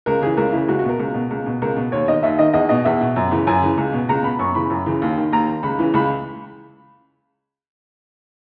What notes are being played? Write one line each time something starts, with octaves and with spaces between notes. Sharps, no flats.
C#2 A#4
C#3 E3 G#4
C#2 A#4
C#3 E3 E4
C#2 F#4
F#4
B2 A#4
C#2
B2
C#2
B2
C#2 A#4
B2
D#2 C#5
D#3 D#5
D#2 E5
D#3 D#5
E2 D#5
B2 D#5
E2 E5
B2
F#2
C#3 E3
F#2 G#5
C#3 E3
C#2
B2
C#2 A#5
B2 B5
F#2 C#6
C#3 E3 B5
F#2
C#3 E3
D#2
D#3
D#2 A#5
D#3
C#2 B5
C#3 E3
C#2 B5